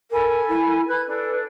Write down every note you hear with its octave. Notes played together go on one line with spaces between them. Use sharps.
A4 A#4 G#5 B5
E4
B4 B5 F#6 G#6
D4 A4